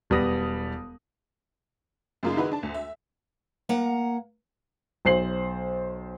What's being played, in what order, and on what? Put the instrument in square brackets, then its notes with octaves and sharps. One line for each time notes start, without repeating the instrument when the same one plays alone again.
[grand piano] E1 G3 B3 D#6 A#6
[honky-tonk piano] F#2 C#3 A#3 D#4 F4
D#3 D#4 E4 F#4 G#4 B4
D4 A5
D2
E5
[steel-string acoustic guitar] A#3 F#5 A#5
[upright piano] B1 C5 C7 F#7